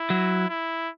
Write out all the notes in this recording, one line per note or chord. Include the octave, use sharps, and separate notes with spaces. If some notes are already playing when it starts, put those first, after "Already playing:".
Already playing: E4
F#3
E4